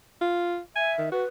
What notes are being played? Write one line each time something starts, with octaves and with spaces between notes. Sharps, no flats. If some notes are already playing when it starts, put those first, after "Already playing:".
F4
E5 G#5
D#3
F#4 B4